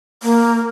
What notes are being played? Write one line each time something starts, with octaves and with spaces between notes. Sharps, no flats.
A#3